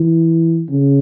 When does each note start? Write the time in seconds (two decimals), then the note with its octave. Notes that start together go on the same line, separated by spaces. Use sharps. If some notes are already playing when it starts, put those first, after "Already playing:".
Already playing: E3
0.70 C#3